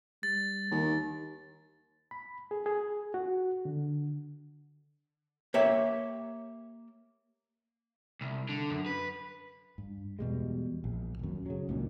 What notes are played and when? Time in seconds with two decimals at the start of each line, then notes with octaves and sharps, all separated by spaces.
0.23 G3 A6
0.71 D#2 D#3
2.11 B5
2.51 G#4
2.66 G#4
3.14 F#4
3.65 D3
5.54 A#3 G4 C#5 E5
8.21 C2
8.49 D3
8.70 F#2
8.86 B4
9.78 G2
10.19 E2 B2 G3 G#3
10.84 A#1
11.19 D#1 F#2
11.46 C#3 F#3
11.69 C#2 G2 A#2 D#3